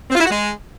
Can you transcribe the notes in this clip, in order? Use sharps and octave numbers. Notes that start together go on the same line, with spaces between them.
C4
F4
E4
F#4
G#3